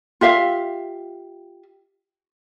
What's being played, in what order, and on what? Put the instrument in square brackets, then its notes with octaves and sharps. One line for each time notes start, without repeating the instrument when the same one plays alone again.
[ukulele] F4 G4 E5 F5